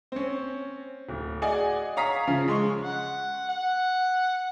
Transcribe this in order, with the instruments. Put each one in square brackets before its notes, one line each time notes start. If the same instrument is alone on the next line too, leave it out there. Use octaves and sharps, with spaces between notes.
[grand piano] C4 C#4
D1
G#4 D5 D#5 F#5 G#5
C#5 F5 A#5 D#6 B6
C#3 F3
G#3 C6 C#6
[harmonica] F#5
F#5